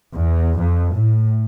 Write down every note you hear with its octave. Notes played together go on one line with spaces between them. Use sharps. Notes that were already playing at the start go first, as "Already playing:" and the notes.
E2
F2
A2